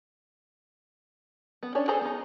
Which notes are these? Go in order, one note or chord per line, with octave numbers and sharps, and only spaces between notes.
B3
C#4 D4 C#5
G#4 A4 C5 G#5 A#5
B3 D#4